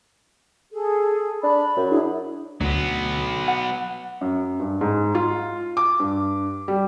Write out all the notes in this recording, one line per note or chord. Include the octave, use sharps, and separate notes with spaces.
G#4 A4
D4 B5
F#2
D4 E4 G#4
D2 F#3 B3
F#5
F#2
G2
G#2
F4
D6
G2
G3